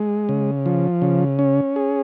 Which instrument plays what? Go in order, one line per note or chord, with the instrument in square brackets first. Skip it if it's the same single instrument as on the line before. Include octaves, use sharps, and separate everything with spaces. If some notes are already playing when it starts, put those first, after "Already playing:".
Already playing: [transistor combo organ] G#3
C#3
F3
C#3
C#4
G#4